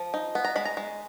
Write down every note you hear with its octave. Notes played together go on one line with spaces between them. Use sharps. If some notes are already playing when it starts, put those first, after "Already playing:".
Already playing: F3
D#4
B3
A#5
G#3 B5
A#5
G#3